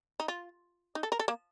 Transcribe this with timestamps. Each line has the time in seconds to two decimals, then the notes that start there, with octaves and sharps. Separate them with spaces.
0.20 D#4
0.28 F4
0.95 D#4
1.03 A4
1.12 A#4
1.19 A4
1.28 A#3